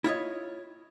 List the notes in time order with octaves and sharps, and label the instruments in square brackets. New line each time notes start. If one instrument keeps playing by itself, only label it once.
[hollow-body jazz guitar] E4 F4 C#5 D#5